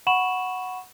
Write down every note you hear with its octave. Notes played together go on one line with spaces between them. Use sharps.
F#5 B5 C#6 E7 F#7